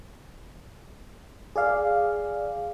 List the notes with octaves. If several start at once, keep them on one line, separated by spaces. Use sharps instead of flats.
G#4 D5 F5